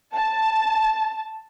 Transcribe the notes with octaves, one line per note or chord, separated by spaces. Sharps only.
A5